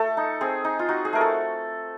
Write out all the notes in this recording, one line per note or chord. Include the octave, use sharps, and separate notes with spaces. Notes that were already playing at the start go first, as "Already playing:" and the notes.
Already playing: A3 A4
D#4
C4 G#4
D#4
F4
D#4 F#4
G#4
A3 A#4
A4